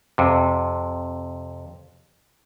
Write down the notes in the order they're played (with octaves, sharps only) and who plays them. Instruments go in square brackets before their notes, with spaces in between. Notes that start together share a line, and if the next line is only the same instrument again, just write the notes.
[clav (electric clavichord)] F2 C3